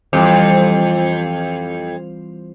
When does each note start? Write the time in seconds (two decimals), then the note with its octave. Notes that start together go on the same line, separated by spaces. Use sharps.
0.13 F2 E3 G3 C5